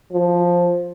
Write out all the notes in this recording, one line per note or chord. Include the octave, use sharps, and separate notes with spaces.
F3